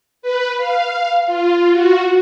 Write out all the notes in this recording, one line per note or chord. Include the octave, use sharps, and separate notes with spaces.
B4
F5
F4
F#4